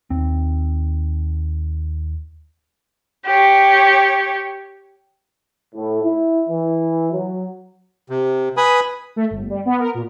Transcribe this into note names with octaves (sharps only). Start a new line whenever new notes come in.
D#2 C4
G4 C#5
A2
E4
E3
F#3
C3
B4 G#5 B5 D#6
A3
G1
G3
B3
A#4
A#2